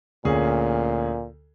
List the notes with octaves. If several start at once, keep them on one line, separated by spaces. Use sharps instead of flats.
D2 A#2 C#4 G#4